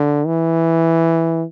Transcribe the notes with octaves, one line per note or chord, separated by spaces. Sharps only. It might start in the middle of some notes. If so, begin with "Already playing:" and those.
Already playing: D3
E3